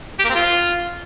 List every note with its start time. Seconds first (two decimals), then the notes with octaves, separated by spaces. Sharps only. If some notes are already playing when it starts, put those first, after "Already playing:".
0.19 G4
0.24 A#3
0.29 C4
0.35 F4